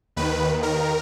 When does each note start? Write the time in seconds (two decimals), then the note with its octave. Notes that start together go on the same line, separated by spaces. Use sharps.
0.16 D#2 D#3 B4
0.63 A#4